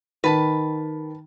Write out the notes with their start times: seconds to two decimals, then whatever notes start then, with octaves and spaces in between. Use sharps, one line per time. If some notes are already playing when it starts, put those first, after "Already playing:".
0.24 D#3 B4 A5 B5